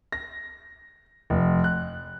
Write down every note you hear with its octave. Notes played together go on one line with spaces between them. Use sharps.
A#6
F1
F#6